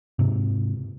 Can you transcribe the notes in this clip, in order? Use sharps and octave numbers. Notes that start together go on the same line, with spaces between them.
G#2 C3